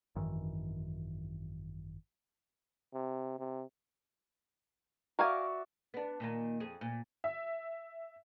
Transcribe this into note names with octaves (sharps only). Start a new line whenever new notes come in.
G#1 F#2 D#3 E3
C3
C3
F#4 A#4 D5 E5 F5 G#5
B3 D4
A#2 D#3 A#3
F2 G#4
A#2
E5